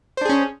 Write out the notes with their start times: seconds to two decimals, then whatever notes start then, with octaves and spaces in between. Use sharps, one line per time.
0.17 C5
0.21 D4
0.25 G#4
0.29 C#4